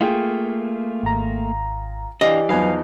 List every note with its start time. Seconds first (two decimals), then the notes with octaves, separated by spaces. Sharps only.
0.01 A3 A#3 F4 G#4 G5
1.03 G#1 A#5
2.21 E3 D4 G4 D5 D#5 F5
2.49 E2 F3 F#3 D#4 B4 F5 G#5